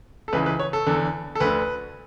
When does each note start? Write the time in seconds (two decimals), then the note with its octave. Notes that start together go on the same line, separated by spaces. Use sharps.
0.28 A4
0.33 C#2 C#3 E3 B4
0.46 B4
0.60 C#5
0.73 A4
0.86 E2 D3
1.35 A4
1.40 D2 D3 B4